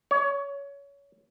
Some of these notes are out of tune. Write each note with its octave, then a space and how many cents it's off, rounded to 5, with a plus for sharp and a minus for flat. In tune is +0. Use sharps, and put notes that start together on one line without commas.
C#5 +20